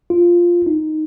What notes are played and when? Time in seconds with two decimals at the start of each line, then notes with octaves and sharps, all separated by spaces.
0.10 F4
0.66 D#4